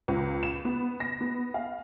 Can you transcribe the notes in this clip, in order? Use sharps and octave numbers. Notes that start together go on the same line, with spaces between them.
C#2
E7
B3
A#6
B3
F5